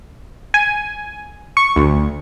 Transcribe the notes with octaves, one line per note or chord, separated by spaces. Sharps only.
G#5
C#6
D2